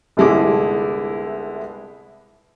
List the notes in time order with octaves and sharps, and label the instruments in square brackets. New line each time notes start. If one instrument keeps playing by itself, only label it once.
[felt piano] G1 C2 G#3 E4 D6